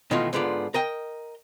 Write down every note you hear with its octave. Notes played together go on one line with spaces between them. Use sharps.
B2 D#3 E3 G#3 A3 F4
G#2 D3 B3 F4 D5
A#4 D#5 G5